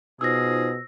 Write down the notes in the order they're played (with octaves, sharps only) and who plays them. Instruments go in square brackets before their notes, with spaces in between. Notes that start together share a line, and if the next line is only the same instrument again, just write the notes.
[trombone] B2 [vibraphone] D#4 F4 C5 [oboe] G#4 [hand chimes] E6 A#6